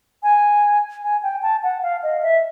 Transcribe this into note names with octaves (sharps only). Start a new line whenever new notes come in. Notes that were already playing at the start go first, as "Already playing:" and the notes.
G#5
G#5
G5
A5
F#5
F5
D#5
E5